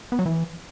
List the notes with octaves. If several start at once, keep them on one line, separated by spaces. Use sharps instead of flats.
B3
F#3
E3